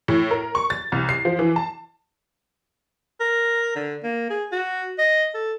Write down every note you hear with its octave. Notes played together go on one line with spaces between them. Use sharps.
A2
A#4
C#6
A6
C2
C7
F3
E3
A5
A#4
D3
A#3
G#4
F#4
D#5
A4